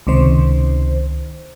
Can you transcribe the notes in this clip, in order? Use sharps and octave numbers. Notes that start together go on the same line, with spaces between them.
C#2 C3 D#3 C5